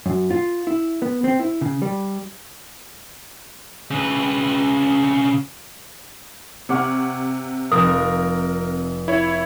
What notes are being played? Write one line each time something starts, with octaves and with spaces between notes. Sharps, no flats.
F#2
F4
E4
B3
C4
E4
C#3
G3
C#3 B4
C3 C#5 F#5 D6 F6
F1 A#4 D#6
E4 C#5